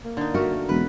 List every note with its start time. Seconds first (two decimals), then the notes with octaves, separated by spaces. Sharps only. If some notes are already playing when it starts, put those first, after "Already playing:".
0.05 A#3
0.17 D3 D#4
0.34 A3 F#4 A#4
0.69 E1 B4